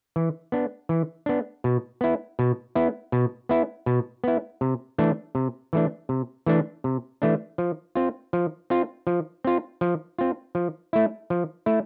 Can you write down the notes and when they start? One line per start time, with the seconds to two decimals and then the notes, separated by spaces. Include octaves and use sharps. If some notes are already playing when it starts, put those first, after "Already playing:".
0.16 E3
0.52 B3 D4
0.89 E3
1.26 B3 D4
1.64 B2
2.01 B3 E4
2.39 B2
2.75 B3 E4
3.12 B2
3.49 B3 E4
3.86 B2
4.24 B3 E4
4.61 C3
4.98 E3 A3 D4
5.35 C3
5.73 E3 A3 D4
6.09 C3
6.47 E3 A3 D4
6.84 C3
7.22 E3 A3 D4
7.58 F3
7.95 C4 F4
8.33 F3
8.70 C4 F4
9.07 F3
9.44 C4 F4
9.81 F3
10.18 C4 F4
10.55 F3
10.93 A3 E4
11.30 F3
11.66 A3 E4